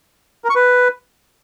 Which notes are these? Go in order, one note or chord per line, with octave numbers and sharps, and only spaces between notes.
A#4
C#6
B4